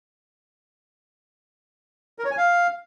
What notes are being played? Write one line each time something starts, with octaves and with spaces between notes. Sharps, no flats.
A#4
C#5
G#5
F5